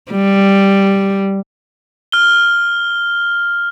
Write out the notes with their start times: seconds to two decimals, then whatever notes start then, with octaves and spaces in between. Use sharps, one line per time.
0.11 G3
2.12 F6 G7